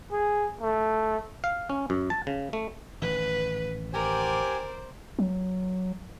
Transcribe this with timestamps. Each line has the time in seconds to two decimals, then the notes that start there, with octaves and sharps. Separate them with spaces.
0.12 G#4
0.61 A3
1.44 F5
1.69 C#4
1.90 F#2
2.10 A5
2.27 C#3
2.53 A3
3.02 A1 D#3 B4
3.93 G4 A#4 C5 D5 G#5
5.19 F#3